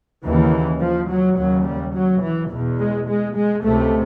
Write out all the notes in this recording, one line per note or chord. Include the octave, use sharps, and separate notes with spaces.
D#2 C#3 E3
F3
F#3
D#2 C#3 F#3
G3
F#3
E3
E2 B2
G#3
G#3
G#3
C#2 C3 A3